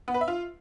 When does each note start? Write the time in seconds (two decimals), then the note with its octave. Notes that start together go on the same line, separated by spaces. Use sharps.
0.08 B3
0.14 B4
0.21 E5
0.28 F4